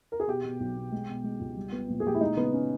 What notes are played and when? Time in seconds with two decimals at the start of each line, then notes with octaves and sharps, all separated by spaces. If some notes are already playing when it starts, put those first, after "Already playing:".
0.12 A#4
0.20 G#4
0.27 B2 G4
0.44 B2
0.60 B1
0.76 B2
0.92 G#3
1.09 B2
1.24 G#3
1.40 C#2
1.57 G3
1.72 B3
1.89 A#1
2.00 G#4
2.05 A#1 G4
2.14 E4
2.21 G#3 D#4
2.37 C#3 B3
2.53 C#4